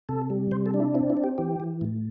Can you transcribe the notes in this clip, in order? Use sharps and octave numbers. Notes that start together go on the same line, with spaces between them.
C3 A4
G3
C3 C5
A4
D4
E4
C4 E4
E4
C4
G4
E3 G4
E3
A2